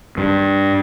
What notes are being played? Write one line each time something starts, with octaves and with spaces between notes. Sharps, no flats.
G2